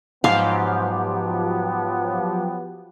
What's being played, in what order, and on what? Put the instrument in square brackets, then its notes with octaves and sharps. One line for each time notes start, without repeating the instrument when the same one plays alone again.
[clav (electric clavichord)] G#2 [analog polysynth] F3 F#3 G4 [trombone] B3 [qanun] F5